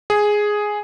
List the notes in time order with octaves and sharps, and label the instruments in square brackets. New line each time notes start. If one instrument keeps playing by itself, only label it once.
[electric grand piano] G#4